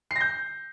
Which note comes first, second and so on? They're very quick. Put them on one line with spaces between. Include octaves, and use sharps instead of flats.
C7 A#6 G6